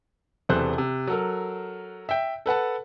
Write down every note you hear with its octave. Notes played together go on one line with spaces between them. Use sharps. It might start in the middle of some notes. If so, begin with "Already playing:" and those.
E1 C3 E3 A4 C5 F#6
C3
F#3 A4 A#4
E5 G5
A4 B4 F#5 A5